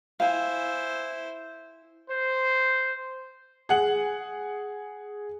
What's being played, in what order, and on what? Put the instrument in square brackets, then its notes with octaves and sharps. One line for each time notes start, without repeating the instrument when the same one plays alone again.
[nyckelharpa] E4 C5 [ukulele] F5 G#5
[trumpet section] C5
[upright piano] G#4 F#5 F#7